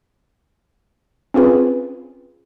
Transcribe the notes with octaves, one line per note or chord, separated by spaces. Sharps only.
C4 C#4 F4 G#4 B4